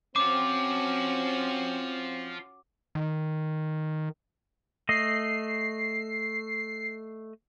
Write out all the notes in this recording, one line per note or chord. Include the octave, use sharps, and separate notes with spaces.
C4 C#4 F4 F#4 C5 D6
D#3
A3 D#5 C7